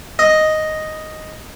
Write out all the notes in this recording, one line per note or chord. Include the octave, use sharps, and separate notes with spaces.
D#5